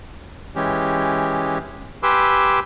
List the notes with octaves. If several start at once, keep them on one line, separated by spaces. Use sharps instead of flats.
E3 G#3 C#4 G4
G4 B4 G#5 C6 D6 E6